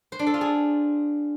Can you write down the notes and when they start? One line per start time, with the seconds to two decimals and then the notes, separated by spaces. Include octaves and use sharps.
0.12 C5
0.19 D4
0.27 A4
0.34 F4
0.41 G#4